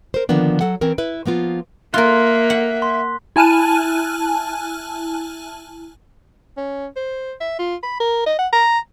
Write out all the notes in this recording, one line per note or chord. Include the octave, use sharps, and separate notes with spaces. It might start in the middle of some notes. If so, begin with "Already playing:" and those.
A#4 C5
D3 D#3 F3 A#3 B3 D4
F#3 A4 F#5
E3 C4 C#4 A#4
E4 B4 E5
F3 A#3 B3 F4
A#3 F4 A#4 E5 F#6
F#5
C6 B6
E4 G#5 A5 F6 F#6 D#7
C#4
C5
E5
F4
B5
A#4
D#5
F#5
A#5